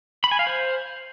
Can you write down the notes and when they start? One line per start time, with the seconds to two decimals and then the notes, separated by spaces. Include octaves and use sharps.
0.24 B5
0.31 G#5
0.39 F5
0.47 C5